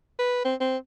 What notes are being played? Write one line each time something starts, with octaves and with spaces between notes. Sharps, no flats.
B4
C4
C4